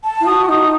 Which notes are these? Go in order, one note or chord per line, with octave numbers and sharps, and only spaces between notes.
A5
E4
F#4 D#6
C#6
D#4 D#6